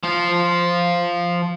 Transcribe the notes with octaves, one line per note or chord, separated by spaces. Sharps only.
F3 F4